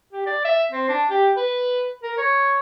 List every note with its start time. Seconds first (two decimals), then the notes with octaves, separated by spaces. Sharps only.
0.13 G4
0.26 D5
0.45 E5
0.71 C4
0.89 D4
1.10 G4
1.37 B4
2.03 A#4
2.18 C#5